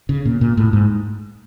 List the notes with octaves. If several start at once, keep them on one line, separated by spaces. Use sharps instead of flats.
C#3
A#2
A#2
A2
G#2